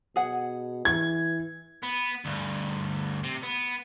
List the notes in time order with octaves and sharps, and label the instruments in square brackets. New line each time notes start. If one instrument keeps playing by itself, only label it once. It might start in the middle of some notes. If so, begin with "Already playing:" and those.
[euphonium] B2 [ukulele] G#4 F#5
[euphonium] E3 [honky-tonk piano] G#6
[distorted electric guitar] B3
D2 G2
C3
B3